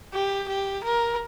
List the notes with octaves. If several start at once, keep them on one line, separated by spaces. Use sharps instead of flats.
G4
G4
A#4